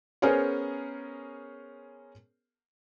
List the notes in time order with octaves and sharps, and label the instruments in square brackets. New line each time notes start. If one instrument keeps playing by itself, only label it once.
[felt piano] B3 C#4 G#4 A#4 C5 C#5